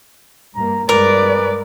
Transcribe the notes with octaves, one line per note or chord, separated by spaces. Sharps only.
G2 A#3 A#5
G2 G#3 A#4 B4 D5